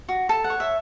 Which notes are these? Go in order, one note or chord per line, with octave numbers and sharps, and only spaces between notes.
F#4
A4 A5
F#5
C#5
E5